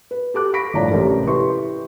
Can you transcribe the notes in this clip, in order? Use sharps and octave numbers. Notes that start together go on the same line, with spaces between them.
B4
G4 A4 D6 F#6
B5 C#6 A#6 B6 D7
G1 A2 F3 C#5 D5 A#5
A1 C3 C#4 A4 A#4
E4 G4 B4 C6 C#6